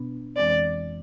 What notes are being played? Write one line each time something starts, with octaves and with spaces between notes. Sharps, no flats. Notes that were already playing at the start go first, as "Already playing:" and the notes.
Already playing: B2 B3 D4
F2 E3 G#3 C4 D5